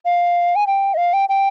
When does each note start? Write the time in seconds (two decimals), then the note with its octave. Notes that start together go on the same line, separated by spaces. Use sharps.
0.05 F5
0.56 G#5
0.67 G5
0.94 D#5
0.97 F5
1.13 G5
1.29 G5